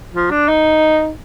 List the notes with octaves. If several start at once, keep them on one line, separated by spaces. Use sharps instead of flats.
F3
D4
D#4